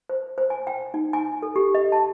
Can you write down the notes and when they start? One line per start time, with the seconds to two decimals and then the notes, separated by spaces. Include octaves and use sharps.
0.09 C5
0.38 C5
0.50 G#5
0.67 G5
0.94 D#4
1.13 G#5
1.42 A4
1.56 G4
1.75 D#5
1.92 A5